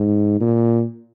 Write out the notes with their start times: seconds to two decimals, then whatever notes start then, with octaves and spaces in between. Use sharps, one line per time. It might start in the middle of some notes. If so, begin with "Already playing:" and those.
Already playing: G#2
0.41 A#2